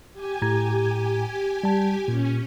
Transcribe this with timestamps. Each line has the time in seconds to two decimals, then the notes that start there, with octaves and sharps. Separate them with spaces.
0.13 G4 G#5
0.42 A2 A#5 G#6
1.63 G3 A5
2.08 A#2 C#4